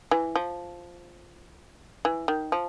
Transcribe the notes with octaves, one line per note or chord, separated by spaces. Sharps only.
E3
F3
E3
D#3
F3